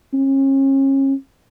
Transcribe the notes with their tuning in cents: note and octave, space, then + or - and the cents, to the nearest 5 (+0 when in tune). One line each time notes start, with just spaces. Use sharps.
C#4 -35